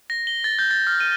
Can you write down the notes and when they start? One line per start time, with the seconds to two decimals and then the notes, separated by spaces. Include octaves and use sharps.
0.10 A#6
0.27 G7
0.44 A6
0.59 G6
0.71 A6
0.87 F6
1.00 D#7